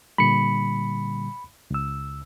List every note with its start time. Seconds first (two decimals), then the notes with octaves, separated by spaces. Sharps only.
0.18 A#2 D3 G3 B5 C#7
1.71 C#2 E6